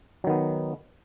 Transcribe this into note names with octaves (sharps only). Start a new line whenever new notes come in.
D#3 F#3 B3